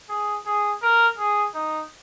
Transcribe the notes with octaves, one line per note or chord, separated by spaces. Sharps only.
G#4
G#4
A#4
G#4
D#4